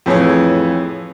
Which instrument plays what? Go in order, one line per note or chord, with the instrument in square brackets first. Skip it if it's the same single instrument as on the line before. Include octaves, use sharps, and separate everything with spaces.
[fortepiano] F2 A2 E3 G#4 C#5